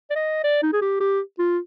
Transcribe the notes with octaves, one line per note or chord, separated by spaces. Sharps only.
D5
D#5
D5
D#4
G#4
G4
G4
F4